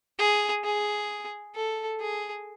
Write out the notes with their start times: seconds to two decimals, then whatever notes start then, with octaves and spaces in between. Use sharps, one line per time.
0.19 G#4
0.64 G#4
1.55 A4
2.00 G#4